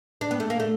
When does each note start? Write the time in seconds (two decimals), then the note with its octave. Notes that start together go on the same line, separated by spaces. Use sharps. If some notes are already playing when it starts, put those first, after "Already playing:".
0.21 D4
0.31 B3
0.40 A3
0.50 A#3
0.60 A3